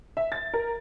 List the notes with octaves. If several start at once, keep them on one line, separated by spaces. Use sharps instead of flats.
E5
A6
A#4